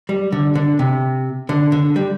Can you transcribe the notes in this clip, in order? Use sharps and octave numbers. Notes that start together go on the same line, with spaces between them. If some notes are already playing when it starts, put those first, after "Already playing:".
G3
D3
D3
C3
D3
D3
G3